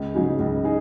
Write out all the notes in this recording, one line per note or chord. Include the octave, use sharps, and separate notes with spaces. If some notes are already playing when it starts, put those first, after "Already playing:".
Already playing: C#2
C#3 F#3 D#4 G#4
C#2
D#4 G#4